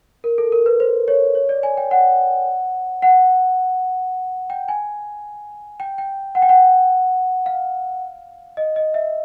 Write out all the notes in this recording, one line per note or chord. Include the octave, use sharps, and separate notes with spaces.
A#4
A4
A#4
B4
C5
C#5
C#5
D5
G#5
G5
F#5
F#5
G5
G#5
G5
G5
F#5
G5
F#5
F5
D#5
D#5
E5